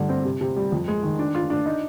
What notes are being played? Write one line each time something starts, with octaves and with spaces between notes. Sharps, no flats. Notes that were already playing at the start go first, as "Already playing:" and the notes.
Already playing: G2 D3
C4
C3
C3
G3
F2
G#3
D#3
D4
F4
D4
D#4